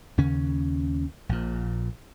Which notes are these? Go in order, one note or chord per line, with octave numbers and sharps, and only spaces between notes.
D#2 C#3 C#4
A#1 A#2